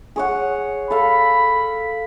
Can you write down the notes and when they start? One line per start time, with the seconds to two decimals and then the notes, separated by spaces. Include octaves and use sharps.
0.16 G#4 C#5 F#5
0.91 A4 F5 B5